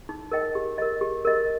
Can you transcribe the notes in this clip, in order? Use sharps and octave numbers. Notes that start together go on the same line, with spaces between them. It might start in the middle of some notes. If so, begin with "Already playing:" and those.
D#4
A#4 D#5 G5
G4
A#4 D#5
G4
A#4 D#5